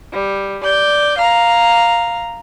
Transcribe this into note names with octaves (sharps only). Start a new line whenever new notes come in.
G3
D5 G6
F5 A#5